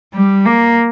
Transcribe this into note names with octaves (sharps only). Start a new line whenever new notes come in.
G3
A#3